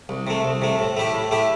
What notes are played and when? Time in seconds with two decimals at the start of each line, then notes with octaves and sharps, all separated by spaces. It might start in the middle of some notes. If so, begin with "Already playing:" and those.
0.09 C2
0.27 C3 A3
0.45 C2
0.62 C3 A3
0.79 A2
0.97 A3 E4 G4
1.14 A2
1.31 A3 E4 G4